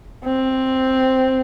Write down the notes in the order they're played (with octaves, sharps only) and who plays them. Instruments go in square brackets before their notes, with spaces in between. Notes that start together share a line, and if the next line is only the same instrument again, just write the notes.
[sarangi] C4